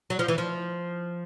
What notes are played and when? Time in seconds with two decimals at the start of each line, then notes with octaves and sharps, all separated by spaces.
0.10 F#3
0.19 F3
0.28 E3
0.38 F3